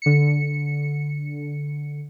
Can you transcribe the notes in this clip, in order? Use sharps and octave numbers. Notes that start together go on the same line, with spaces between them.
D3 C#7